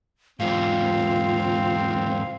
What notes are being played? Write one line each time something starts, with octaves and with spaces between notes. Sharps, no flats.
E2 G#2 C4 F4 F5